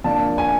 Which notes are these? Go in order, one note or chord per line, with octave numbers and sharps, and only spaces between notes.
F3 A#3 D4 A5
G#5